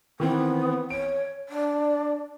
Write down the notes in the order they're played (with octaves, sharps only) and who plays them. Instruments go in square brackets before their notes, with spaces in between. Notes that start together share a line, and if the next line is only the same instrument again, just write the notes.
[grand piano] D#3 E3 C4 [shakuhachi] B3
[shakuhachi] C#5 [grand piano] D7
[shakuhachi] D4